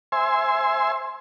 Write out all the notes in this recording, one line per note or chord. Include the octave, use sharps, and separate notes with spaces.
C5 E5 G#5 C6